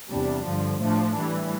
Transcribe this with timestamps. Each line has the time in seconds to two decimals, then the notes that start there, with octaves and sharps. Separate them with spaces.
0.10 E2 C3 G3 D4
0.46 G2 D3 F3
0.80 A2 F3 A3 D4
1.15 A2 E3 G3